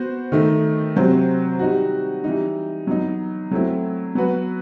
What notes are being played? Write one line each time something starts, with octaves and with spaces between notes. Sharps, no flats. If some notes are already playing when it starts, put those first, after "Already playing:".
Already playing: B3 F#4 C5
D#3 A3 D#4
C3 F#3 C4 F#4 C5
G3 D#4 F#4
E3 G3 D#4
F#3 B3 D#4
F#3 A3 C4 E4
F#3 B3 F#4 B4